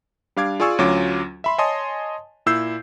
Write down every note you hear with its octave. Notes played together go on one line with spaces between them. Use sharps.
G3 D4 F5 D6 G#6
F4 G#4 D5 G#5 C#6 E6
D2 F#3 C#4 F4 D6
E5 B5 C6
C#5 D#5 G#5 A5 C6 D#6
A#2 E4 E6 G6 C7